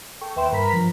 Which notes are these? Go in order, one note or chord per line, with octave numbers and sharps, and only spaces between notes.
A4 G5 C#6
D#2 B4 E5 G5 C6 E7
G2 A#4 A#5 B5 B6
F3